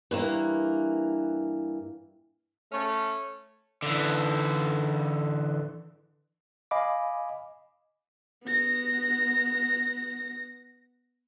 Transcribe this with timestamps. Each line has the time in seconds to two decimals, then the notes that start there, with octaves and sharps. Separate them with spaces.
0.11 G2 E3 A#3
2.72 A3 C#4
3.82 D3 E3
6.71 D#5 F5 G#5 B5 D6
8.44 B3 A#6